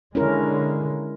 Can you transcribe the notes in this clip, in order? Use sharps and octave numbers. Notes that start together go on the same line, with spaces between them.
D3 G#3 C#4 E4 A#4